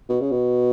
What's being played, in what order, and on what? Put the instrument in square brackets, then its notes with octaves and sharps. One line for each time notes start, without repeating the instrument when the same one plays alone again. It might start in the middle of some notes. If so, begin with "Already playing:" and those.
[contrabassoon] B2
C#3
B2